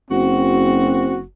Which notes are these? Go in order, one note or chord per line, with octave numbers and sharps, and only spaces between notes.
F#1 C4 F#4